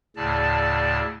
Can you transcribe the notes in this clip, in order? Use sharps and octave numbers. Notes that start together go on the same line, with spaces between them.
D2 A2 C#3 D5 A5